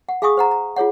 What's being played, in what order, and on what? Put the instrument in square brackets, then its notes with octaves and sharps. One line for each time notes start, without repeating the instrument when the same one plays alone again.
[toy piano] F#5
G#4 F5 G#5 C#6 D#6
C5 F#5 A#5
A#5
F4 G#4 C#5 F#5